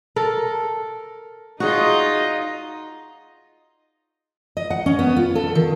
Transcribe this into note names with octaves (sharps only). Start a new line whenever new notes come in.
A4 A#4
D#4 F4 F#4 G#4 D#5
D#5
F#5
C#4
B3
F4
A4
D#3